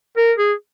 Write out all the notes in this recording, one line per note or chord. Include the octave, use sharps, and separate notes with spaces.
A#4
G#4